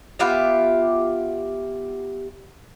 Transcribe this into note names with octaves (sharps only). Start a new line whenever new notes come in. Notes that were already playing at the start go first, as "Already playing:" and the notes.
B3 F4 G4 E5